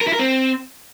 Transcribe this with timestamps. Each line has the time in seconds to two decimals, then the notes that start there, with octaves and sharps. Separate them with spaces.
0.01 A#4
0.07 E4
0.13 A#4
0.19 C4